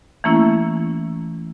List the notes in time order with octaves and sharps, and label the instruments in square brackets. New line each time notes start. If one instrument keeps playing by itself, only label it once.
[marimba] E3 A3 A#3 C#4 E4